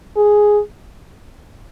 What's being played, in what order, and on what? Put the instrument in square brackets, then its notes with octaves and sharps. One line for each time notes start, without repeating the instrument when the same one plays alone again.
[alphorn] G#4